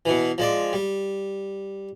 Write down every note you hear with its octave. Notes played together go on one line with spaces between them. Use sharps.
B2 E3
F3 G#3 D5
G3